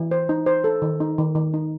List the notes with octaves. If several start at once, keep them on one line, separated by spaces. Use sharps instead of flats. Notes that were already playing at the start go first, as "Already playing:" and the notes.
Already playing: E3
C5
D#4
C5
A4
D#3
D#4
D#3
D#3
D#4